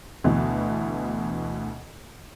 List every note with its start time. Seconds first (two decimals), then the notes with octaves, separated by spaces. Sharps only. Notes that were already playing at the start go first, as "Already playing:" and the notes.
0.24 D2 B2 E3